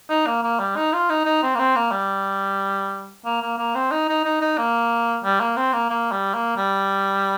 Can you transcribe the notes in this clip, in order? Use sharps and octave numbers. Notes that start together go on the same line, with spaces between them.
D#4
A#3
A#3
G3
D#4
F4
D#4
D#4
C4
A#3
C4
A#3
G3
A#3
A#3
A#3
C4
D#4
D#4
D#4
D#4
A#3
G3
A#3
C4
A#3
A#3
G3
A#3
G3